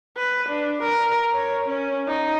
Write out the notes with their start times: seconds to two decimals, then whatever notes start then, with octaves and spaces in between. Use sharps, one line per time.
0.17 B4
0.49 D4
0.83 A#4
1.34 C#5
1.69 C#4
2.08 D#4